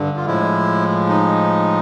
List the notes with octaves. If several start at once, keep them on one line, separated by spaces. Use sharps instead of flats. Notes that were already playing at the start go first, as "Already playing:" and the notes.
Already playing: G2 D3
F4
A2 F3 G#3 E4
D#4